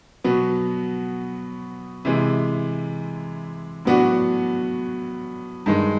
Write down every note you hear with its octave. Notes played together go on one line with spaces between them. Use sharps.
B2 F#3 B3
C3 E3 G#3
A2 F#3 B3 D4 F#4
G2 D#3 G#3